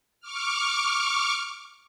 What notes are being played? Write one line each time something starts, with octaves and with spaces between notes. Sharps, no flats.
C#6 D6 F6